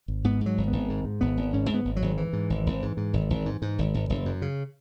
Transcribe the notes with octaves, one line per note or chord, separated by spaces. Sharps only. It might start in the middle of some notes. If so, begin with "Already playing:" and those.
G#1
G#2 B3
G#2
F#3
G#1
G#1 B3
G#2
G#2
G#1 B3
G#1
G#2 C#4
G#2 B3
G#1
F#3
G#1
G#2 E3
G#2
G#1
G#1
G#2
G#2
G#1
G#1
G#2
G#2
G#1
G#1
F#1
F#2
C#3